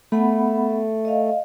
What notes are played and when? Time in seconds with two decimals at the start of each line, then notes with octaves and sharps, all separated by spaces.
0.12 A3 B3 F#5 B5
1.05 D#5 F5